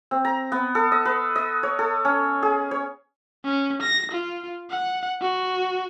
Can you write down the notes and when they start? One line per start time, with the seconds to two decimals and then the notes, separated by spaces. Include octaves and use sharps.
0.11 C4
0.25 A#5
0.52 B3
0.75 A4
0.92 D#5
1.05 B4
1.36 D#5
1.63 C#5
1.79 A4
2.05 C#4
2.43 G#4
2.71 C#5
3.44 C#4
3.82 A#6
4.12 F4
4.70 F#5
5.21 F#4